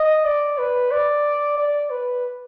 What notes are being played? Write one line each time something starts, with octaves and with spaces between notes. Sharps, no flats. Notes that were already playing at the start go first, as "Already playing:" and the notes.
Already playing: D#5
D5
B4
D5
D5
B4